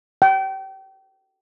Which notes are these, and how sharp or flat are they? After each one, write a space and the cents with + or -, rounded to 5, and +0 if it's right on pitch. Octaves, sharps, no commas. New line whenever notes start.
G5 -30